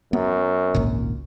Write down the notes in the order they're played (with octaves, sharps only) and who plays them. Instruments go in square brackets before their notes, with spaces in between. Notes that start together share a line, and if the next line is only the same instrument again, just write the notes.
[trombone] F#2 [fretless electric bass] B3
[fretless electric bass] G#1 C#2 A#2